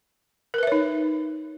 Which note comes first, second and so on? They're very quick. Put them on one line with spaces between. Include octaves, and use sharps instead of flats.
A#4 B4 E5 C#5 D#4